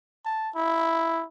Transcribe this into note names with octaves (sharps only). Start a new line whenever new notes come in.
A5
E4